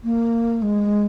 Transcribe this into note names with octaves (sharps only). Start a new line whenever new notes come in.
A#3
G#3